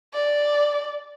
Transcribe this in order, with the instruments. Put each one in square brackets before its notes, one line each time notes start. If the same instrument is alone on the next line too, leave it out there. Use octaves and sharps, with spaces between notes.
[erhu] D5